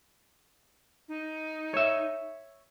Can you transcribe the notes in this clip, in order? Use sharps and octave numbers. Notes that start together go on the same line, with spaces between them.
D#4
C#5 E5